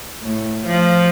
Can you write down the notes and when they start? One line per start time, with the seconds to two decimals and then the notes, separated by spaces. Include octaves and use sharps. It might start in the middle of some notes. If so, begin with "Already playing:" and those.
0.23 A2
0.67 F3